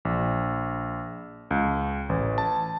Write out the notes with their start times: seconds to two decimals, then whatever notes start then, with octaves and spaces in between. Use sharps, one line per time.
0.05 A#1
1.51 C#2
2.09 A1
2.38 A5